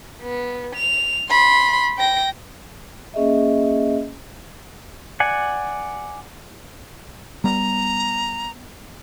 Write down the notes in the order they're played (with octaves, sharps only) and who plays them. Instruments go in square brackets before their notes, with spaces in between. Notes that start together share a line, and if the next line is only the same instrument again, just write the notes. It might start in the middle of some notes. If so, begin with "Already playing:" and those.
[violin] B3
F7
B5 C6
G5 A#6
[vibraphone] A#3 C#4 G#4 D#5 E5
[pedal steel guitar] D5 F#5 G#5
[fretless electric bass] G3 B3 [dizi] A#5